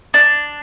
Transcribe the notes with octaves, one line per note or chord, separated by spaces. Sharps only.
D4